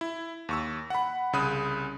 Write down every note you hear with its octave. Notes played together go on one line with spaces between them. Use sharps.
E4
D#2 C#6 E6
F#5 B5
C2 C#3 B5 D#6 F#6 D#7